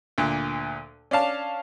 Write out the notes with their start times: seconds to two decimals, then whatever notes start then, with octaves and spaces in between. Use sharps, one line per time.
0.18 D2 A#2 F#6
1.11 C#4 D4 F5 A5